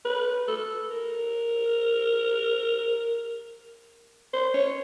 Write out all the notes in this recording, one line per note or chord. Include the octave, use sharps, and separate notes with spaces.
B4
A4
A#4
C5
C#5